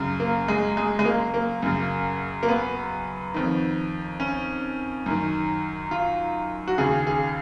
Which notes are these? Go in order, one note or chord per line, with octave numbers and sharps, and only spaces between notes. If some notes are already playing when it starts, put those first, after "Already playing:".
Already playing: F#2 C#3
A#3
G#3
G#3
G#3
A#3
A#3
F#2 C#3
A#3
B3
F2 D#3
C#4
F#2 D#3
F4
F#4
D#2 C#3 G#4
G#4